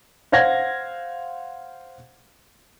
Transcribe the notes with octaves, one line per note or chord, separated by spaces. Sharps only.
C5 F5 F#5 G#6 A#6